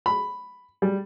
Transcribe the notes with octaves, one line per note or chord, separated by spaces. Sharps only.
B5
G3